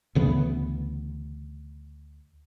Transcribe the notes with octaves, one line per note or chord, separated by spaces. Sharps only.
D2 C#3 E3 B3